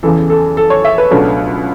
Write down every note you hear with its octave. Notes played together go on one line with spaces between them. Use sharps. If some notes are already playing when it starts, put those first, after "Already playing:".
E2 C#3 E3 A4
A4
A4
C#5
E5
B4
C#2 B2 F#3 A3 D4